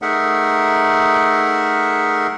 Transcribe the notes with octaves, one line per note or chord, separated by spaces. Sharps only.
A3 D#4 G#4 A#4 E5 F#5